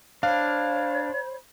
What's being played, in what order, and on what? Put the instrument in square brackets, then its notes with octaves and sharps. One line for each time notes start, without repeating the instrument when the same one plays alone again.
[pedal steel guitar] D4 [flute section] C5 C#5 B5 [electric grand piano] F5